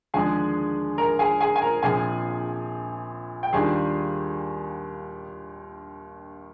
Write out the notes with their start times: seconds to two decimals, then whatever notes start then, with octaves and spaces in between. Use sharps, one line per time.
0.14 D#2 D3 F3 G#3 D4 G#4 G#5
0.98 A#4 A#5
1.19 G#4 G#5
1.41 G#4 G#5
1.56 G#5
1.62 A#4 A#5
1.83 A#1 A#2 F3 C4 G#4 G#5
3.43 G5
3.53 D#2 D#3 G3 D4 F4 G#4 G#5